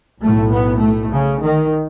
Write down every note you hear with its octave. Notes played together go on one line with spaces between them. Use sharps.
B1 A2 A3
B3
A3
C#3
D#3